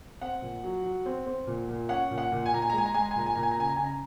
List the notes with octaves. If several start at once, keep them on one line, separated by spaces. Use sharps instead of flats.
C4 F#5
A#2
F#3
F#3
C4
C4
A#2
A#2
C#4 F#5
A#2
F#5
A#2
G#5
A#2 A#5
G#5
A#5
G#3
G#5
A#5
G#3 G#5
A#5
G#5
A#2 A#5
G#5
A#2 A#5
G#5
A#5
C#3 G#5
A#5
C#3 G#5
A#5